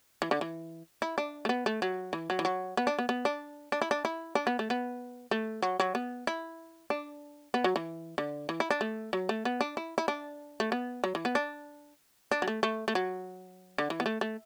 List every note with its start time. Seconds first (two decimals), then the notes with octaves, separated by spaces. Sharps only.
0.22 E3
0.31 D3
0.41 E3
1.02 E4
1.18 D4
1.45 A3
1.49 B3
1.66 A3
1.82 F#3
2.13 E3
2.30 F#3
2.39 E3
2.45 F#3
2.77 B3
2.87 D4
2.99 B3
3.09 B3
3.25 D4
3.72 D4
3.82 E4
3.91 D4
4.05 E4
4.35 D4
4.47 B3
4.59 A3
4.70 B3
5.31 A3
5.62 F#3
5.80 F#3
5.95 B3
6.27 E4
6.90 D4
7.54 B3
7.64 F#3
7.76 E3
8.18 D3
8.49 E3
8.60 E4
8.70 D4
8.81 A3
9.13 F#3
9.29 A3
9.45 B3
9.61 D4
9.77 E4
9.98 E4
10.08 D4
10.60 A3
10.72 B3
11.04 F#3
11.15 E3
11.25 B3
11.35 D4
12.31 D4
12.42 F#3
12.48 A3
12.63 A3
12.88 A3
12.95 F#3
13.78 D3
13.90 E3
14.00 B3
14.06 A3
14.21 A3